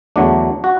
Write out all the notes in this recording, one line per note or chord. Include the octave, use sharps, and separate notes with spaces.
E2 D3 F#3 A3 D4
F#4